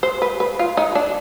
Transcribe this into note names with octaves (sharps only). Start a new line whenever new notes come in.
C5
B4
B4
F4
D#4
D4